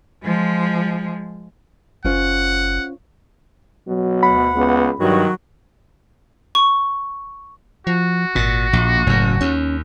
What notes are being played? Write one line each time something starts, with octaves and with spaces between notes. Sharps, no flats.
F3 G#3
F#1 C#4 F4 C5 F#5
B2 F#3
D2 F#5 B5
C#2 B3
G2 D#3 F#3 F#4
C#6
F3 F#4
G#1 A#2
A#1 A#2
F#1 F#2 A2
D#2 C#4